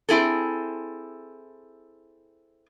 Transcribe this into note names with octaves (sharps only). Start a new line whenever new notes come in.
C4 E4 G#4 A4